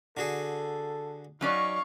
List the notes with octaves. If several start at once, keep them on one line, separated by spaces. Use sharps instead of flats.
D3 F#4 G#4 A4
F#3 C#4 D#4 D5 F5 C#6